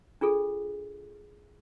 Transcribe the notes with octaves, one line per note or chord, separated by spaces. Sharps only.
D4 F4 G#4 A4